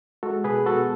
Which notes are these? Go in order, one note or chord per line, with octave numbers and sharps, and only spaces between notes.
G#3 F#4 A4
B2 G#4 B4
B3 F#4 A4